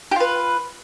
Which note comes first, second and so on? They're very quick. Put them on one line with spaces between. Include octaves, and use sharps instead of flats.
G4 F4 B4